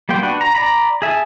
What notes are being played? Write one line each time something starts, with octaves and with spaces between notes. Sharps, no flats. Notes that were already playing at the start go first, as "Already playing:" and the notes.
G3 A#3 B3 G5 C6
D4 F#4 B4
A#5
D5 A#5 B5
G#4 E5 G#5 A5